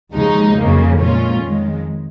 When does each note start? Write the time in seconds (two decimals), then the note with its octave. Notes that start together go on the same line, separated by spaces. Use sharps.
0.14 D#2 C#3 F3 G#3 D#4
0.57 F2 C#3 F#3 A#3
1.00 A#2 G#3 C#4 F4
1.42 F2 D#3 G#3